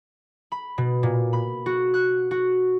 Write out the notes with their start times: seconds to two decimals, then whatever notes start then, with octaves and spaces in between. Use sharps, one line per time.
0.52 B5
0.78 B2
1.03 A#2
1.33 B5
1.66 F#4
1.94 F#6
2.31 F#4